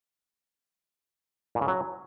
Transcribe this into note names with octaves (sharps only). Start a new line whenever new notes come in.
A#2
C#3
F#3